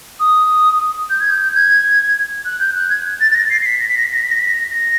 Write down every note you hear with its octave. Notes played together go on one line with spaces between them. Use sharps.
D#6
G6
G#6
G6
G#6
F#6
G6
F#6
G#6
A6
A6
A#6
C7
C7
B6
A#6
B6
A#6
B6
A#6
B6
A#6
B6
A#6
A#6